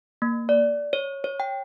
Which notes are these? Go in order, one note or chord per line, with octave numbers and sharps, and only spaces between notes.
A#3
D5
C#5
C#5
G5